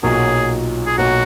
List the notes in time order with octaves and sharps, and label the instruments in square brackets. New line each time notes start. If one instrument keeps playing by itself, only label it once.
[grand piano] B1 A#2 F#3 [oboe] G#4
[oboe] G#4
[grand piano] B1 A#2 F#3 [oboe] F#4